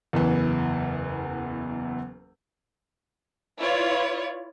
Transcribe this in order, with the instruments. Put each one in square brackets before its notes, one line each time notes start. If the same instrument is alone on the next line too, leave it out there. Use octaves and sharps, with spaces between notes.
[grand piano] F#1 E2 E3
[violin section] E4 F4 B4 C#5 D5